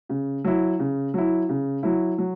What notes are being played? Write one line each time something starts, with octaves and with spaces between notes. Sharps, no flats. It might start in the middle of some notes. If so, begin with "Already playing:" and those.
C#3
F#3 E4
C#3
F#3 E4
C#3
F#3 E4
F#3